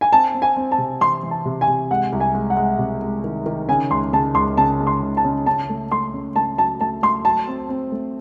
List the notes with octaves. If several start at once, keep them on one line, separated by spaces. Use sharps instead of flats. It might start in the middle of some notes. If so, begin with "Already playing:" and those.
G#5
C4 A5
C4
G#5
C4
A5
C3
E3 C6
E3
A5
C3
G#5
C3
G#3 F#5
C2
G#5
G#3
F#5
G#3
C3
G#3
D#3
D#3
C#3 G#5
C#2 C6
C#3 A5
C#2 C6
C#3 A5
G#3
C6
C#2
A5
C#3
C#3 A5
A3
A3 C6
C#3
A3 A5
F#3 A5
A3 A5
A3 C6
F#3 A5
C4
C4
A3